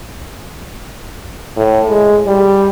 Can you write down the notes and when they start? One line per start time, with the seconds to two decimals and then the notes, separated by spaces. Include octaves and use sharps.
1.57 A2
1.90 G#3
2.27 G3